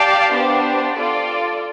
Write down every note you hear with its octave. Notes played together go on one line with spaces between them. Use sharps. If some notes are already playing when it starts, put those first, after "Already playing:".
Already playing: G4 D5 F5 A5
B3 D4 G4 C5
F4 A4 D5